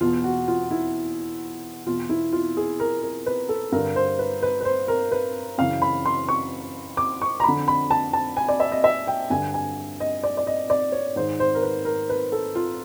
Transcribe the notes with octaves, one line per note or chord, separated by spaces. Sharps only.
E2 B2 F4
F#4
F4
E4
E2 B2 F4
E4
F4
G#4
A#4
A#4
B4
A4
G2 D3 A#4
C5
B4
B4
B4
C5
A#4
B4
F#2 C#3 E3 F5
B5
C6
C#6
D6
C#6
A#5
F2 D3 B5
B5
A5
A5
G#5
D5
E5
D#5
E5
G5
G2 D3 G#5
G#5
D#5
D5
D5
D#5
D5
C#5
G#2 D#3 C5
C5
A#4
B4
A#4
B4
A4
F4